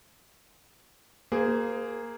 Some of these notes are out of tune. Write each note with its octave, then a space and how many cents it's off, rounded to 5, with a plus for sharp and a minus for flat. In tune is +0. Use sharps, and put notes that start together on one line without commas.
A#3 +0 G#4 +0 C5 -35